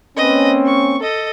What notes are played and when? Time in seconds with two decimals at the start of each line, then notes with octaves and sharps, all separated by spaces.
0.17 A#3 C4 C#4 B4 D#5
0.66 C#6
1.01 A4 D#5